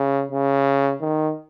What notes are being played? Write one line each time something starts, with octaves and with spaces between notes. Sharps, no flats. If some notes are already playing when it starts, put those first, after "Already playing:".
Already playing: C#3
C#3
D#3